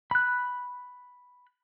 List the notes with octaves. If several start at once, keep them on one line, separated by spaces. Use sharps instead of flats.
B5 F#6